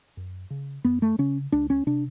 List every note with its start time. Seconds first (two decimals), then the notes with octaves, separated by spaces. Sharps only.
0.17 F#2
0.50 C#3
0.85 F#2 B3
1.02 A3
1.19 C#3 C#4
1.52 C#2 D4
1.70 C#4
1.87 C3 D4